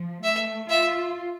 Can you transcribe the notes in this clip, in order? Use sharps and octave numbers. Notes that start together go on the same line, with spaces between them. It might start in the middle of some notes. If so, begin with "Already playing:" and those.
Already playing: F3
A3 E5
F4 E5